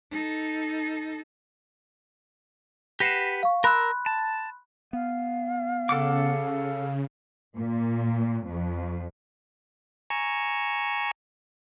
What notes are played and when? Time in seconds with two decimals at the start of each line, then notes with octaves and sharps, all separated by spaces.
0.11 D#4 A4
3.00 G4 B4 F#5 A#6 C7 E7
3.43 F5 C#6
3.64 A#4 B5 C6 E6 F#6
4.06 A5
4.93 B3 F5
5.89 C#3 A4 F#5 D6
7.56 A#2
8.48 F2
10.10 G#5 A#5 C#6 E6